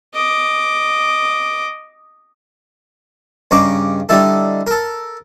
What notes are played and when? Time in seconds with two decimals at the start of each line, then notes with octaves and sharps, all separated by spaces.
0.14 D#5 D6
3.51 G2 C#3 D#4 A#5 C#6 D6
4.09 D3 G3 D#4 E4 A4
4.67 A4 A#4